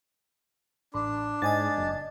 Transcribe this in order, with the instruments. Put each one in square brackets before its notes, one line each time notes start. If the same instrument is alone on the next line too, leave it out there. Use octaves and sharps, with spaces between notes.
[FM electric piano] A1 [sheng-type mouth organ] D4
[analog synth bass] G#2 [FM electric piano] D#5 G#5 A6
[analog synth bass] F#1